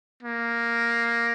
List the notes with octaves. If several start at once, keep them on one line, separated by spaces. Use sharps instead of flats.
A#3